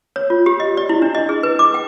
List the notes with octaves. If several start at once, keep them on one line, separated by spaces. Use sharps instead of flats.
C#5
F4
G4
D#5
D5
E4
D4
D#5
G#4
B4
D6
G5